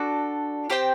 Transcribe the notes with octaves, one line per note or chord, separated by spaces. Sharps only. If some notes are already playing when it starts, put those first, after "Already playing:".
Already playing: D4 F#4 A4 D5
C4 G4 C5 G5